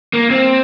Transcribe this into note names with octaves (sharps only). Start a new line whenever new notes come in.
A#3
C4